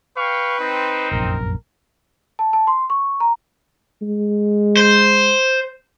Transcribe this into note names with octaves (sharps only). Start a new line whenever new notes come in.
B4 F5 G5 C#6
C4 D#4
F1 A#1 F#2 A#4
A5
A5
C6
C#6
A#5
G#3
C5